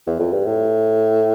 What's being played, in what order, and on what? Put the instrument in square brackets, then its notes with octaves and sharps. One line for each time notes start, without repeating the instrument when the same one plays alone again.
[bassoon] E2
F2
G2
A2